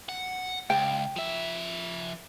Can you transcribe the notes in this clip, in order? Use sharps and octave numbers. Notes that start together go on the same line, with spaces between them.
F#5
C#2 G5
F3 E5